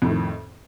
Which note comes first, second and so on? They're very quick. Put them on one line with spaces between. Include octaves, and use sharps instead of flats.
F2 A2 D#3